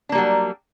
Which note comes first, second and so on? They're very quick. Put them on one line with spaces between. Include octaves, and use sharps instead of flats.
D4 A#3 G3 F#3